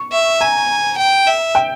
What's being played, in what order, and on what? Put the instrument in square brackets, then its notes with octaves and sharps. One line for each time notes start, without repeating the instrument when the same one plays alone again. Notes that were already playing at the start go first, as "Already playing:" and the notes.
Already playing: [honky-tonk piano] C#6
[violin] E5
[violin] G#5 [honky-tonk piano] A#5
[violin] G5
E5
[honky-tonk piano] G5